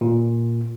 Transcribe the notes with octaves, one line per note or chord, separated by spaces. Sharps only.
A#2